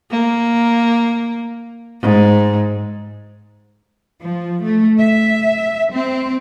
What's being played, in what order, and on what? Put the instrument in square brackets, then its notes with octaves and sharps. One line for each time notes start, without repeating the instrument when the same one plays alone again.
[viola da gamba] A#3
G#2
[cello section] F3
A3
E5
C4